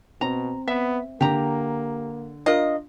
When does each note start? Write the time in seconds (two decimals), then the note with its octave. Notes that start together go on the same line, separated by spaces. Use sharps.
0.21 B2 C4 A#5
0.68 B3 E5
1.21 D3 A#3 G4 A#5
2.46 D4 F4 A#4 D#5 F5